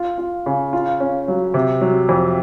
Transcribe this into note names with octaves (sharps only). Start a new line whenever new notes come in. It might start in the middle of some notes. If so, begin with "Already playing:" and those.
Already playing: F4
F4
C#3
F4
C#4
F#3
C3
F#3
F2